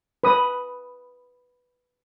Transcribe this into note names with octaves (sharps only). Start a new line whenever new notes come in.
B4 D#6